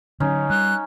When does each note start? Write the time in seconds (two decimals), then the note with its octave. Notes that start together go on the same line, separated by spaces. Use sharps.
0.20 D3 F#3 C#4 D#4
0.50 G3 F#6